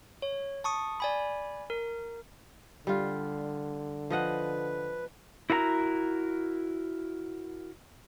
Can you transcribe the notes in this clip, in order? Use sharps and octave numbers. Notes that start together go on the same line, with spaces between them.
C#5
A5 C#6 D#6
D5 G#5 B5
A#4
D3 G3 F4
F3 B4 D#5 F#5
E4 F#4 A#4 F5 A#5